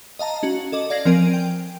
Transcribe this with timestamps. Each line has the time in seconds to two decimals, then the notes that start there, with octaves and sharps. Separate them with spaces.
0.19 D#5 F5 A5 A#5
0.43 C#4 F#4
0.72 A4 D#5 D6
0.90 D5 F5 G#6 A#6 C7 F#7
1.05 F3 C4 A#4 G#5 D7 D#7
1.33 G5